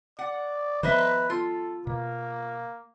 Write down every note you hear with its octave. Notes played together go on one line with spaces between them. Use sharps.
D5 F#5
D#3 F3 B3 B4 C5 D#5 E5
F4 A4
B2 A#3